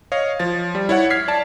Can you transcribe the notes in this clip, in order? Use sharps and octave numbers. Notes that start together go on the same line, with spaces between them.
C#5 D#5 F5
F3 A6
G3
E4 C#5 F#5
F6 G#6 B6 C7
D5 A5